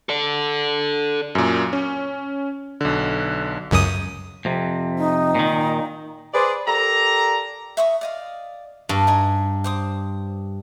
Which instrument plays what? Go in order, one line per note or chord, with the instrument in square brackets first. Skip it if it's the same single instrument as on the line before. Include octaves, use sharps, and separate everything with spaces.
[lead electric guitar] A4 D5
[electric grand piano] F#2 A#2
C#4
B1 D3
[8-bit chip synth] C#2 F#2 D#6
[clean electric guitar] F2 C3
[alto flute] D#4
[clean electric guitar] A#2 D#3
[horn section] G#4 B4 C5 D5
G4 A4 A#4 D5 A#5
[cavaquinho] E5 C#6 D#6
D5 D#5 F5
[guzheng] G2 [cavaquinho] C#6
[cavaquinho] D#4 G#5 A#5
C5 D6 D#6